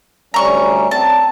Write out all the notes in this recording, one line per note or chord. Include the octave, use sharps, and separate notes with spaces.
D2 G3 C#4 A#5 C#6
C4 A5